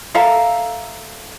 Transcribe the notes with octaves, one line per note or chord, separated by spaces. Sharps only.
A4 E5 F5 A#5